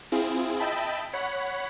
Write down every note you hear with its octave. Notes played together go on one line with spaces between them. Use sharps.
C4 E4 F4 G#4
D#5 E5 G5 A5 B5
C#5 F#5 B5